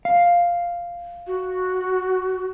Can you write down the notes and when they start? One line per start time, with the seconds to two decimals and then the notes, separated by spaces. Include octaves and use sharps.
0.05 F5
1.27 F#4